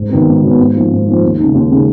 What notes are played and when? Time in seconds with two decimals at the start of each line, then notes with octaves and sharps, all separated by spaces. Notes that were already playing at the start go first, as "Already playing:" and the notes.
Already playing: G#2
0.09 D#3 F#3 B3
0.26 G#2
0.42 D#3 F#3 B3
0.58 G#2
0.74 F3 A#3 D#4
0.90 G#2
1.06 F3 A#3 D#4
1.22 D#2
1.38 C#3 G#3 D#4
1.54 D#2
1.70 C#3 G#3 D#4